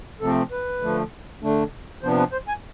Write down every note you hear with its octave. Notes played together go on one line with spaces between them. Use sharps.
C3 F3 A3 C4 A4
B4
D3 F3 A3
D3 A3 D4
C3 F3 B3 D4 C5
B4
C5
G#5